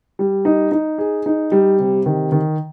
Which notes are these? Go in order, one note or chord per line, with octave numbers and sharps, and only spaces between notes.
G3
D#4
D#4
G#4
D#4
G3
C3
D#3
D#3